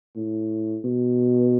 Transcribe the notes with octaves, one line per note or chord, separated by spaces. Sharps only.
A2
B2